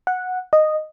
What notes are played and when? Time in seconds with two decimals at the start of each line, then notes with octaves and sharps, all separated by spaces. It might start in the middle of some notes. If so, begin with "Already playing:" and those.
0.07 F#5
0.53 D#5